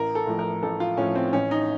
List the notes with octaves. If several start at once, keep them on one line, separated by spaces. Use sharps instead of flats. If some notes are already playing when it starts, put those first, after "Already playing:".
Already playing: A1 A#4
A4
A2 F3
A#4
A1 A4
F4
A2 F3 C#4
C4
A1 C#4
D#4